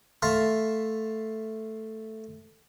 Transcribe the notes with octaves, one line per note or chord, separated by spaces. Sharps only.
A3 E5 F5 A5 C6